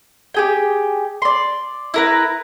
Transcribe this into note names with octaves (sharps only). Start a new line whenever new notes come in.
G4 G#4 G5
D5 C6
E4 A#4 B4